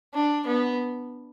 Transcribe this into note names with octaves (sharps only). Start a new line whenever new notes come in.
D4
B3